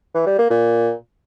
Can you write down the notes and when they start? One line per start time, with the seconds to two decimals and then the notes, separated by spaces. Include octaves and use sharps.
0.14 E3
0.26 G3
0.38 A#3
0.50 A#2